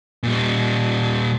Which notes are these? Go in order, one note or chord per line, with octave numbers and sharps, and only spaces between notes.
A#2 G3